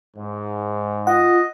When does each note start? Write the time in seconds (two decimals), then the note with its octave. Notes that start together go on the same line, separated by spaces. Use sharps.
0.16 G#2
1.07 F4 D#5 F#5